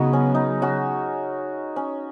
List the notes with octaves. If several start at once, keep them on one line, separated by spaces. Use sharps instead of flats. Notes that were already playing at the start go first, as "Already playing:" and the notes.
Already playing: C#3 F#3 B3 D#4 F#4 G#4
C#4
D#4
C#4 F#4
C#4